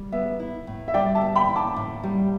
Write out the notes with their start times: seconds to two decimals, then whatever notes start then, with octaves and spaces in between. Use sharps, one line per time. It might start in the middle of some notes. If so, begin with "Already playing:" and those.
Already playing: G3
0.12 B3 E5
0.40 E4
0.67 A2
0.88 E5
0.94 G3 D5 G5
1.15 E5 A5
1.21 B3
1.35 G5 B5
1.49 E4
1.56 A5 D6
1.76 A2
2.04 G3